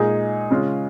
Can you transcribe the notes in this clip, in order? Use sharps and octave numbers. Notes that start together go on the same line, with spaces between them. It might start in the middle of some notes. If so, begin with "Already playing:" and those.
Already playing: A#2 G#3 D#4 G#4
C#3 G#3 C#4 F4